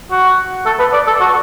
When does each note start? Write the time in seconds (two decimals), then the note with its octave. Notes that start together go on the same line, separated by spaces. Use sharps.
0.12 F#4
0.66 A4
0.79 B4
0.93 D5
1.07 A4
1.21 F#4